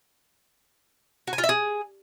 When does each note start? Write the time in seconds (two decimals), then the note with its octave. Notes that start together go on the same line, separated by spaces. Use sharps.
1.27 F#4
1.33 G#5
1.38 F4
1.44 E5
1.49 G#4